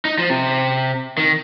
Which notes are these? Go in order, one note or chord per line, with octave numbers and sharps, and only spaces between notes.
D#4
F3
C3
D#3